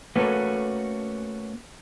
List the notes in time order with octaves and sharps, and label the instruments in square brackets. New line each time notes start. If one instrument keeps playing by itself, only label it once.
[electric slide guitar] A3 A#3 C#4 F#4 A4 B4